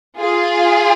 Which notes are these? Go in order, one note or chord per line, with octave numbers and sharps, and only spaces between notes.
F4 G#4